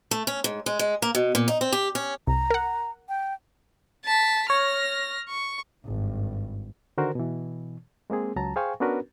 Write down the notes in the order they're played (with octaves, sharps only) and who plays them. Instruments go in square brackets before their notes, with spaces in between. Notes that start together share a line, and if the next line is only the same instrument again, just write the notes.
[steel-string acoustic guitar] A3
C#4
G#2
G#3
G#3
A#3
B2
A#2
D#4
C4
G4
C#4
[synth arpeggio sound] C2 [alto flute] A#5
[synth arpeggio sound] A#4 F#5
[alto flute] G5
[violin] A5 B6
[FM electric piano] C#5 [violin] F6 A#6
[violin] C#6
[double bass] G#1 G2
[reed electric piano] D3 D#3 F#4 A#4 C5
B2 E3
G#3 A#3 C4 G#4
C#2 F#3 A5 A#5
G#4 C5 F5 G5 G#5 C#6
B3 C#4 D4 F#4 A#4 B4